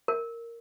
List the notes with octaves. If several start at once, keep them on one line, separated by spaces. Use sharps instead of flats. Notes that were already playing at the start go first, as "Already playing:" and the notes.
A#4